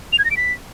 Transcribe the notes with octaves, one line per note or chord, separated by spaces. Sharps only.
F7
G#6
A#6
D7
B6